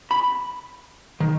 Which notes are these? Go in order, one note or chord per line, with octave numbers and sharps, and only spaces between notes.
B5
D#3